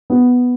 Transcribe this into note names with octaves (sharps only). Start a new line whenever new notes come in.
B3